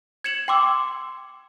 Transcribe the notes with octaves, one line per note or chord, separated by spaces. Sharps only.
G#6 C#7 E7 F#7
G5 C6 D6 E6